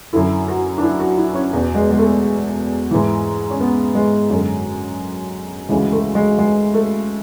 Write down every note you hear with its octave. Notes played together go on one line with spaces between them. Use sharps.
F#2 D3 E4
F#4
D4
E4
F#4
E4
C#4
E2 B2
G#3
G#3
A3
G#2 E3
C#4
B3
G#3
F#2 D3
D2 C#3 E3 G#3
A3
G#3
G#3
A3